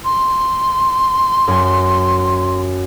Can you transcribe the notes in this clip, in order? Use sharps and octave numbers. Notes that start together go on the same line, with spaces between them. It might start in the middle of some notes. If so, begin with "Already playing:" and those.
C6
F#2 G#5